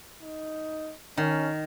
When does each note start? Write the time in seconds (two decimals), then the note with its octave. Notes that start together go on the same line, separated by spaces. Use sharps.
0.23 D#4
1.17 D#3 C#4